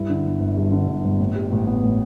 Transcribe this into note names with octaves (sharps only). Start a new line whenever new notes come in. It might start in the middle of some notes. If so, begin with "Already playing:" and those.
Already playing: G2 E4
D3
G1
G1
G2
D3
G1
G1
A2
G3
A1
B3
A2